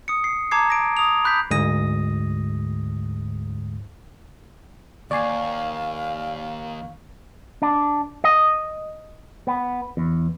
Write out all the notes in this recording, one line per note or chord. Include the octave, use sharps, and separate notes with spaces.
D#6 C#7
C7
A5 A#5 D6 G#6 C7
A#6 D7
D#6 F7
B5 F#6 G6 B6
D2 G#2 G#3 D#6 A#6
D#2 D5 F5 G#5 C#6 C7
D4
D#5
B3
E2